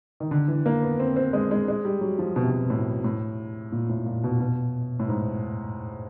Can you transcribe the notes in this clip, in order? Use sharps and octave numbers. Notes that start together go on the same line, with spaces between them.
D#3
D3
E3
A#3
B3
C4
C4
G#3
G#3
G#3
G3
F#3
F3
B2
C3
B2
A2
A2
A#2
A2
A#2
B2
B2
A2
G#2